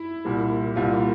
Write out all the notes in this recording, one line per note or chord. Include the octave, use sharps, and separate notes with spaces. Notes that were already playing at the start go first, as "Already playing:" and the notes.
Already playing: E4
C2 A#2 G3
C2 A#2 G3 F4